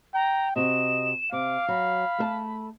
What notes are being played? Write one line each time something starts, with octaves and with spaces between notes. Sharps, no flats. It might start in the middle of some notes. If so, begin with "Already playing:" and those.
G5 A#5
C3 F#4 D#5 E7
C3 F5 D6
F#3 B5
A3 A#4 A5